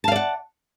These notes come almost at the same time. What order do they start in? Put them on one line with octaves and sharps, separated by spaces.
A5 F5 D5 F#5